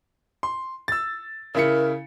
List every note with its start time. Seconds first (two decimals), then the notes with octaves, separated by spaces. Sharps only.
0.43 C6
0.88 E6 A6
1.55 C#3 E4 A#4 C#7